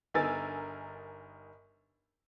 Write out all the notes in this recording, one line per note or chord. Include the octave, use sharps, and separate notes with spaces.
G1 D#4 A#4 G#5 E6 A6